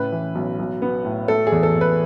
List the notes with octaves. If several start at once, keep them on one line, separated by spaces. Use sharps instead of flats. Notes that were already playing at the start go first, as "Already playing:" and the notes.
Already playing: A2 C#3 B4
E3
B1
B1
B3
A2
A3 A4
G#4
E2
A4
E2
B4